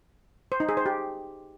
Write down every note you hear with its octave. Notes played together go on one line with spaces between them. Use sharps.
C5
D#4
G#4
C5
G4